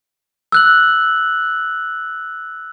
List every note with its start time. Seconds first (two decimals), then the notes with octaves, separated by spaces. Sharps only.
0.52 E6 F#6 F#7